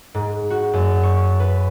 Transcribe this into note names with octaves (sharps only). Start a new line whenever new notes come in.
G#2
F#4
F#2
C#6
B4